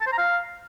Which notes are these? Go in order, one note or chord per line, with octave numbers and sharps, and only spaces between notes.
A5
C5
A#5
F5